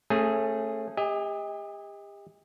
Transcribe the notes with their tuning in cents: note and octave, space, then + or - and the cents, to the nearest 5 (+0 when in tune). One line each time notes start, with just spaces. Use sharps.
A3 +10 C#4 -25 G#4 +0
G4 +40 D#5 +30 G#5 -15